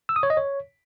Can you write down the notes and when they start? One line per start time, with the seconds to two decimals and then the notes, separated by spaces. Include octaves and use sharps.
0.09 E6
0.16 D#6
0.23 C#5
0.30 D#5
0.37 C#5